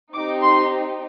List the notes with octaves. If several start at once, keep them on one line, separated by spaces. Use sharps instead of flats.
C4 D#4 G4 D6
C6